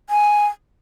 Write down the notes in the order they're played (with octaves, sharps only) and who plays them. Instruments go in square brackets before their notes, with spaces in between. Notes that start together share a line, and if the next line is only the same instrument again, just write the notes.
[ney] G#5